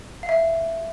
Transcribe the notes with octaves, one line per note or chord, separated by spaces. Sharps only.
F5
E5